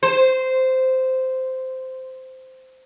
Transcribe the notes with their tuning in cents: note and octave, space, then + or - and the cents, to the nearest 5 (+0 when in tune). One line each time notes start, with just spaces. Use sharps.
C5 -10